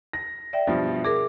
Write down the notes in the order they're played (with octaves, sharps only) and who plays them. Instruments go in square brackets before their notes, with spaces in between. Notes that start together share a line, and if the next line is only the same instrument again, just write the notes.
[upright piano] A#6
[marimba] D5 E5 G5
[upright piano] G2 B2 F3
[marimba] G#4 A#4 [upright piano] D6